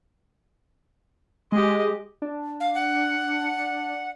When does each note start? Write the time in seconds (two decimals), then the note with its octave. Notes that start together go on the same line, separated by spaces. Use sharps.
1.52 G#3 G4 D#5
2.22 D4
2.60 F5
2.75 F#5